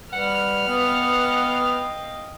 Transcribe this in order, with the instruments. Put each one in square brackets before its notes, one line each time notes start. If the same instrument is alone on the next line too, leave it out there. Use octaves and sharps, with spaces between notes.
[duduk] G3 [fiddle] B4 F6 [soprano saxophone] F#5
[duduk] B3 [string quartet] D#5 F5 G5